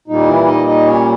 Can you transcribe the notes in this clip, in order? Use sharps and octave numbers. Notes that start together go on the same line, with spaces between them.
A#2 G3 A#3 D#4
E3 E4
D#4 D#5
D#4 D#5
C#4 C#5